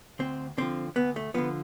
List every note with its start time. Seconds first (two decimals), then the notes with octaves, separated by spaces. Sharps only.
0.19 D2 C4
0.58 D3 F3 C4
0.96 D2 B3
1.16 A3
1.34 D3 F3 B3